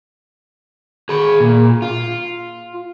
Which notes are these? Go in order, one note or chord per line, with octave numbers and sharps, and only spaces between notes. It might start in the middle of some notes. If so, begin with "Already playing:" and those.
G#4 B5
A#2
F4